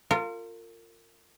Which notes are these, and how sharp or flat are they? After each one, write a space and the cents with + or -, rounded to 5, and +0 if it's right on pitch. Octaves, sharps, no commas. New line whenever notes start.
F4 +0 A#4 -35